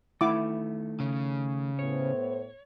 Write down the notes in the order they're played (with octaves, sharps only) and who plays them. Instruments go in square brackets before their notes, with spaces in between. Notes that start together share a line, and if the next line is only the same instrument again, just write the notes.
[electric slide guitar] D#3 A3 [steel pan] E4 D6
[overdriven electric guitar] C#3
[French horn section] A2 B3 C5 [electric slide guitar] C#5